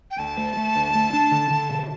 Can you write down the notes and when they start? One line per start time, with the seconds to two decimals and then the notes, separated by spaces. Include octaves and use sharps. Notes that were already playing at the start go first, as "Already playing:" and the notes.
0.11 G5
0.19 D2 A5
0.37 A3
0.57 A3
0.75 D2
0.95 A3
1.13 D4
1.31 D3
1.50 D3
1.70 B2